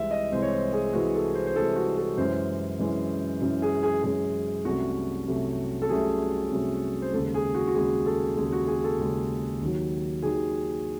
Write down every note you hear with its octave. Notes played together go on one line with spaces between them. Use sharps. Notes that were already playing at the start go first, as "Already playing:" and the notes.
Already playing: C2 C3 E3 G#3 E5
D#5
C2 C3 E3 G#3 C5
C#5
C5
G#4
C2 C3 E3 G#3 F#4
A4
C5
C5
C2 C3 E3 G#3 A4
F#4
A4
F#2 E3 G#3 C#4 C5
F#2 E3 G#3 C#4
F#2 E3 G#3 C#4
G#4
G#4
F#2 E3 G#3 C#4 G#4
C2 C3 F#3 A3 C#4 F#4
C2 C3 F#3 A3 C#4
A4
C2 C3 F#3 A3 C#4 G#4
C2 C3 F#3 A3 C#4
C5
D#2 C#3 G#3 A4
G#4
F#4
F#4
D#2 C#3 G#3 G#4
A4
D#2 C#3 G#3 G#4
F#4
G#4
A4
D#2 C#3 G#3
D#2 D#3 F#3
D#2 D#3 F#3 G#4